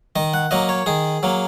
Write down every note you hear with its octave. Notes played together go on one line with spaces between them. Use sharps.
D#3 D#5
F#5
F#3 A#3 D#5
C#5
D#3 G#4
F#3 A#3